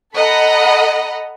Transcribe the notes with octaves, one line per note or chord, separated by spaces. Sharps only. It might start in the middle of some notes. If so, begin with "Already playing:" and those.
A4 D#5 F#5 A#5 B5